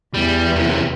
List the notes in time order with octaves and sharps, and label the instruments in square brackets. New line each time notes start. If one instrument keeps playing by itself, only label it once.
[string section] E2 [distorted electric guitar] G3
[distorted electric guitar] F#2 C3